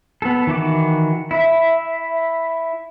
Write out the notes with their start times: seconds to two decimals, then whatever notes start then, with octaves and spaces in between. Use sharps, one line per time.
0.22 B3 A4
0.47 D#3 E3 F#4 D6
1.31 E4 E5